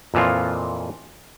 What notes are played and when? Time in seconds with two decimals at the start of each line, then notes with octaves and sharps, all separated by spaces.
0.14 F2 A#2 E3 F3 F4